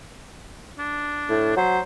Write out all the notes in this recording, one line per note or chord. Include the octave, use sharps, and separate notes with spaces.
D4
A2
F#3 C5